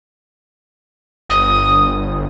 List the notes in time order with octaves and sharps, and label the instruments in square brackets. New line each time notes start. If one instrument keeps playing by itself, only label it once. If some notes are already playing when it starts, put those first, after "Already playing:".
[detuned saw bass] G1 [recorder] D#6